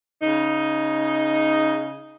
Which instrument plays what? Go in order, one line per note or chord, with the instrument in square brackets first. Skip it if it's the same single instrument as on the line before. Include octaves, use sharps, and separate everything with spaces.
[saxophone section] C#3 D#4